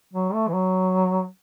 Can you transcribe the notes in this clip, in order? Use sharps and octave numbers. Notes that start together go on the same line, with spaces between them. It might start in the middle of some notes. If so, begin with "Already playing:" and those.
F#3
A3
E3
F#3